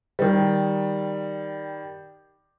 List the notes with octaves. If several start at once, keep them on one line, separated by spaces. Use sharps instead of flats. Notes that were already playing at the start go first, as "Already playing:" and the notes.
D#3 G3